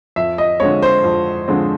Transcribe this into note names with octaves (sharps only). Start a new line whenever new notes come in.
F2 E5
D#5
D3 F3 G#3 C4 C#5
C5
F2
D3 F3 G#3 C4